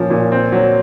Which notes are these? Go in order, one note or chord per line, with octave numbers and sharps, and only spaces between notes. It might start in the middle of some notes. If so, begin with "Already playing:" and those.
Already playing: A#2 F3 A#3 C#4
A#2
C4
F#3